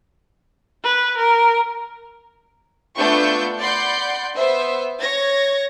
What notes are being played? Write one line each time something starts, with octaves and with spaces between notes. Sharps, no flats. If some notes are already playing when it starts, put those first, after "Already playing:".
B4
A#4
A3 B3 D4 F4 C#6 G6
D5 F#5 B5 C6 G6
B3 C5 E5
C#5 G#6 A#6